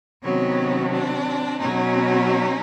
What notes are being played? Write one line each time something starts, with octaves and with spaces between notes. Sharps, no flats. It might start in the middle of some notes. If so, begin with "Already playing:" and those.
C3 D#3 F#3 B3 C#4
C4 D4
B2 F#3 C#4 D#4